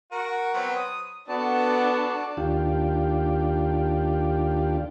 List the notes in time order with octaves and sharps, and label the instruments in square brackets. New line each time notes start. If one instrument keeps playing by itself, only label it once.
[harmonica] F#4 A#4
F#3 B3 C4
D#6
[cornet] B3 [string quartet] D4 A4 [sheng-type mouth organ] F#4 D5 A5
[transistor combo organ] D#2 D4 F4 G4